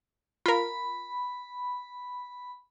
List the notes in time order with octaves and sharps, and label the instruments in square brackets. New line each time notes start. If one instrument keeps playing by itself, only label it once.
[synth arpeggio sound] F4 A#4 [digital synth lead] B5